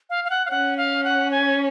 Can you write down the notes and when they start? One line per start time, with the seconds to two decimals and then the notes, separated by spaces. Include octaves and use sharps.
0.10 F5
0.24 F5
0.30 F#5
0.46 F5
0.50 C#4 F#5
0.77 F5
1.04 F#5
1.31 G#5